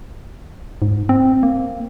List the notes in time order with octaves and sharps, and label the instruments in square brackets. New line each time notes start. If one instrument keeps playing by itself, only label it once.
[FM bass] G#2
C4
A#3